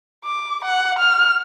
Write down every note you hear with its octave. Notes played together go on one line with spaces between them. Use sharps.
D6
F#5
F6